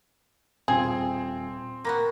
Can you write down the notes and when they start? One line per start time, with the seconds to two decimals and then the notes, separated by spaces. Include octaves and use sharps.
0.68 D#1 C4 F4 G#4
1.85 A#3 B3 F#4 A#6